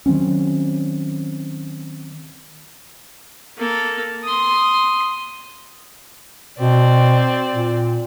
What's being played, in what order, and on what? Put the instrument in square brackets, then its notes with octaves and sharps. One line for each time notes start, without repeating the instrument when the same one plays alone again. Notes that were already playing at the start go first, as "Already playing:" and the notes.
[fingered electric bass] D#3 F#3 C4 C#4
[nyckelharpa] A#3 A4
C6 D#6
[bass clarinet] B2 [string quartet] C4 D5
[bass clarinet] A#2